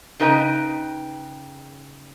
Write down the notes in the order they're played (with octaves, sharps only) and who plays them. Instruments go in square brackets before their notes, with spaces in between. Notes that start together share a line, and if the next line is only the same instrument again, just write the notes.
[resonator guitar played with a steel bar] C#3 D#4 B4 D#5 G5 A#5